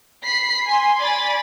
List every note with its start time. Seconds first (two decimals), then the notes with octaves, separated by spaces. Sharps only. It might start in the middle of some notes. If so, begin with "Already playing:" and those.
0.25 B5 B6 C7
0.66 G#5 C6
0.98 D5 G#5 B5 A6